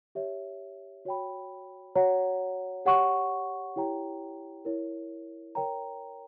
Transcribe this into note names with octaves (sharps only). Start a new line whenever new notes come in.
G4 C#5 E5
F#4 C#5 G5 B5
F#4 C#5 F#5 A#5
G4 C#5 F#5 C#6
E4 G4 C#5 G5 A#5
E4 A#4 C#5
A#4 C#5 G5 A#5